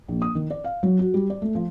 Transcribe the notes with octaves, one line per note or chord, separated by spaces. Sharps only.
A#1
D#6
D#3
D5
F5
F#3
F#4
G3
D5
A3
F3